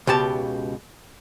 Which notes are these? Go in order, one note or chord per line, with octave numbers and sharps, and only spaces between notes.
C#2 B2 G4 A5